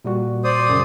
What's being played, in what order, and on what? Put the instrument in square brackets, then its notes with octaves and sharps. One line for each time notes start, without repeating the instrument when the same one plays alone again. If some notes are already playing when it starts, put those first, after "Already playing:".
[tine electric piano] A#2 G3 F#4
[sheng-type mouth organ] C5 D5 D#6
[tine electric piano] F#2 C#3